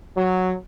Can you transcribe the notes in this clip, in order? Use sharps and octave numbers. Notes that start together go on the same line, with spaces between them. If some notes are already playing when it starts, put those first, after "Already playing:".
F#3